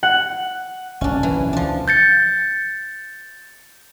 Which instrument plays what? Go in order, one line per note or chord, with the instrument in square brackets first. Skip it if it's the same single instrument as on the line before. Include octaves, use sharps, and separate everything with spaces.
[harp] F#5
[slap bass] F#1 C2 [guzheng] C#4 D4
[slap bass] A#1 E2 [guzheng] E3
[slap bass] B1 C3
[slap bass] D2 B2 [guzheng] F3 D4
[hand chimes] G6 A6 C#7